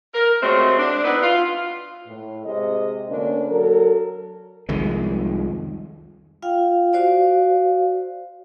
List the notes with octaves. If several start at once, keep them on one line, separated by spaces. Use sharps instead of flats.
A#4
C3 F#3 G#3 A3 C4
D4
B3 D#4 E4 B4
F4
A2
C3 G#3 D#5
D2 A#3 C#4 D4
F#3 A4 A#4
C2 F2 D#3 G#3
F4 F5 G5
F#4 C5 D5 F5